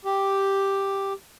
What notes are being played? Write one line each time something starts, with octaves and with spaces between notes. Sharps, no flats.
G4